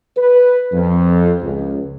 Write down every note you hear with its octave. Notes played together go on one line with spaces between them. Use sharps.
B4
F2
C#2